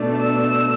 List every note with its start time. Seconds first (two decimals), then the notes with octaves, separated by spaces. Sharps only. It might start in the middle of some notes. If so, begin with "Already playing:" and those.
Already playing: B2 A3 D4
0.21 E6